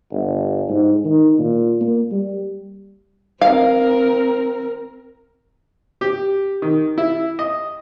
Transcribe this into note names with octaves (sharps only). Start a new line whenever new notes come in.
G1
G#2
D#3
A#2
A#3
G3
C4 A#4 F5
G4
D#3
E4
D#5